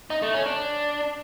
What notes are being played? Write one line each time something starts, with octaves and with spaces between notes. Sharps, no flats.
D#4
A3
C#4
D4